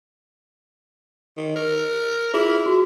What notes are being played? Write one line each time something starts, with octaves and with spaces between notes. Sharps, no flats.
D#3
A#4
E4 F4 G#4 B4
F#4